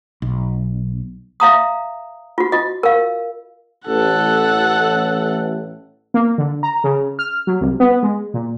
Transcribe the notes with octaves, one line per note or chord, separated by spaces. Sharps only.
B1
E5 F5 A#5 D#6
F4 F#4
F4 D#5
A#4 F5
A1 A4 F#5
A#3
D3
A#5
C#3
F6
F#3
C2
B3
G#3
A#2